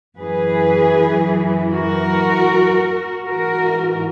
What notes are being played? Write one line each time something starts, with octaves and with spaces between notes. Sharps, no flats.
F#2 E3 G#4 B4
F#4 A#4
G#2 E3 F#4 A#4